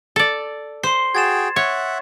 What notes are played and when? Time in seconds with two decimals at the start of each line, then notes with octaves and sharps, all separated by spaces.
0.16 A4 D5
0.83 C5 C6 C7
1.15 F#4 G#4 G5 G#6 A6 E7
1.56 C#5 E5 F#5 C#6